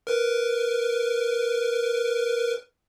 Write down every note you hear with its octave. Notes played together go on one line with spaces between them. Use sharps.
A#4 B4